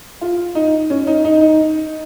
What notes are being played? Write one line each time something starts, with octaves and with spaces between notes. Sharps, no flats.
F4
D#4
C#4
D#4
D#4
D#4